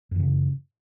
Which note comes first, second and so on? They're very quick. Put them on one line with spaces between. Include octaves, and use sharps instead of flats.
F#2 E3 C#3